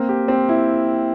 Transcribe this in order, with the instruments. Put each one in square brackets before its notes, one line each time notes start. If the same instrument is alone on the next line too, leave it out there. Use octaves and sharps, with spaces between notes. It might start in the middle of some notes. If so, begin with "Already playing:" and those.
Already playing: [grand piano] A#3 C4
G4
C4
E4